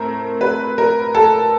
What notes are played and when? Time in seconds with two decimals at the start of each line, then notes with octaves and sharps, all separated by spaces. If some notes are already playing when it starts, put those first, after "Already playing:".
Already playing: A2 A3 C4 A#4
0.41 B4
0.78 A#4
1.15 A4